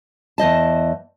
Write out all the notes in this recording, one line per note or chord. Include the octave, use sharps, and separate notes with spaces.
E2 C5 D#5 A5